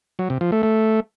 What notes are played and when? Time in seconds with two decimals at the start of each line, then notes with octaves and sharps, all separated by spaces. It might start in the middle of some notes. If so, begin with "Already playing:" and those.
0.19 F#3
0.30 C3
0.41 F3
0.52 A3
0.63 A3